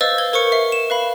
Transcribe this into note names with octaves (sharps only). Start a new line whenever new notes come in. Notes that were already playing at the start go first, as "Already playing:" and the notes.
B4 C5 D#5 F5 E6 A6
G#6 G7
A#4 C5 C#6 C#7
E5 C7
E7
B4 F5 B5